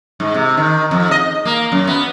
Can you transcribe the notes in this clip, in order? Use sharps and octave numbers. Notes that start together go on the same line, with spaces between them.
G#2
C3
D#3
F2
D#5
A#3
F#2
B3